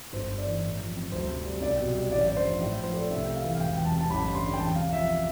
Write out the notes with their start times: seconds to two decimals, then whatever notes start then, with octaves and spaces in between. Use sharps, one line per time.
0.13 G1 C5
0.30 G2
0.38 D5
0.46 E3
0.63 A2
0.79 F3
0.95 C4
1.12 D2 C5
1.28 C3
1.46 G3
1.61 C2 D5
1.78 B2
1.95 G3
2.11 A1 D5
2.28 G2 D5
2.37 C5
2.44 F3
2.60 A2
2.78 F3
2.83 C5
2.94 A3 D5
3.10 C2 E5
3.27 C3
3.36 F5
3.44 E3
3.54 F5
3.60 E1 G5
3.77 E2 G5
3.85 A5
3.93 C3
4.01 A5
4.10 A1 B5
4.26 G2
4.35 C6
4.43 D3
4.53 G5
4.59 E2 A5
4.75 C3 F5
4.92 F3 E5